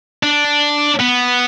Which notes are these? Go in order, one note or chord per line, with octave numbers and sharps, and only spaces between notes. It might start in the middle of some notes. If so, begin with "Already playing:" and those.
D4
B3